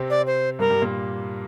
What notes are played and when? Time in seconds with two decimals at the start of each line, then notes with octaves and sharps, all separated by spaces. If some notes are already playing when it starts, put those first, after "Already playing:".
Already playing: C3 C4
0.10 D5
0.27 C5
0.59 G2 G3 A#4
0.70 G2 G3
0.82 A#2 A#3